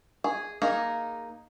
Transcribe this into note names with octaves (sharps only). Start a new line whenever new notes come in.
G#4
A#3 D#4 G#4